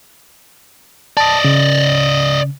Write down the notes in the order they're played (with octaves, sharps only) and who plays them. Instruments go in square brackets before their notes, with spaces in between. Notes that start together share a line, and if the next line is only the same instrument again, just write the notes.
[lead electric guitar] D5 D#5 [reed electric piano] A5
[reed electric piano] C#3